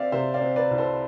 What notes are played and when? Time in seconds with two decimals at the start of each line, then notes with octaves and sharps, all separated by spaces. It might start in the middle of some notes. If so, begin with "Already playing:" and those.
Already playing: C4 D5 E5 F5
0.12 C3 C5 E5
0.34 D5 F5
0.41 C4
0.56 B4 D5
0.71 C2
0.78 A4 C5